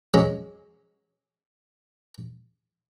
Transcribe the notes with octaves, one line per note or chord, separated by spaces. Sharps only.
F#3 G#3 C#4